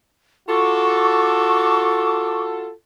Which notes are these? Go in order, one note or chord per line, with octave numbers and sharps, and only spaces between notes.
F4 F#4 A4 C#6 D6